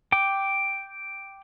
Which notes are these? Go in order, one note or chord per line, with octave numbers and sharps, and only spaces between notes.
G5 D6